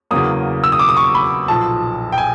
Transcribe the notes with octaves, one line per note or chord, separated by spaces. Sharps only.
E2 C#3 F#3 A#3 D#6
E6
D#6
D6
D#6
C#6
B5
B1 A#2 F3 A5
G5
G#5